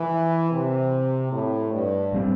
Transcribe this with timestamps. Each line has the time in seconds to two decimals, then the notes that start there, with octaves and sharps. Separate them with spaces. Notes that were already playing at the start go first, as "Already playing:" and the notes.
Already playing: E3
0.51 C3
1.32 A2
1.72 G2
2.13 A2 G3 C4